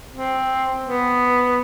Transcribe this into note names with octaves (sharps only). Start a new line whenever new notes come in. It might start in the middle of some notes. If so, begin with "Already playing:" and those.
C4
B3